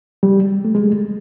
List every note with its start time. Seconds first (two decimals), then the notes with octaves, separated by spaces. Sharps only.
0.23 G3
0.65 A3
0.75 G#3